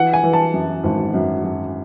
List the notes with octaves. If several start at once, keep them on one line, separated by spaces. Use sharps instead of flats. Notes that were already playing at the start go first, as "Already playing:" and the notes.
Already playing: E3 F#5
G#5
E3
A5
F#2
G#1
F#2
F#2